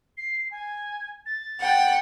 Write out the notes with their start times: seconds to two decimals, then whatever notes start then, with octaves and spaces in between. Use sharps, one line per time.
0.17 C7
0.51 G#5
1.26 A6
1.61 F#5 G5